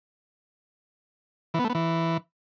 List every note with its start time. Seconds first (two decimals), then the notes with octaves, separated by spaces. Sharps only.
1.54 E3
1.59 B3
1.64 A3
1.70 B3
1.75 E3